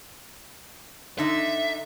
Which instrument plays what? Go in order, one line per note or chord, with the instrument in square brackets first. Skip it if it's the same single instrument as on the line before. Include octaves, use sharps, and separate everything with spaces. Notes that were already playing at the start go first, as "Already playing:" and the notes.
[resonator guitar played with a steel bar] D3 D#4 [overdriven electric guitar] E5